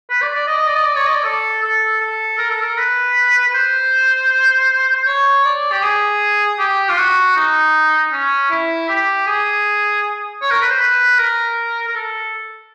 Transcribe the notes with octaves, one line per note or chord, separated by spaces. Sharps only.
B4
D5
D5
D#5
D#5
D5
D#5
D5
C#5
D#5
D5
A4
A4
A4
A#4
A4
A#4
B4
B4
C5
C5
C#5
D5
G4
G#4
G4
F4
F#4
D#4
C#4
E4
G4
G#4
C#5
A#4
B4
C5
B4
A#4
A#4
A4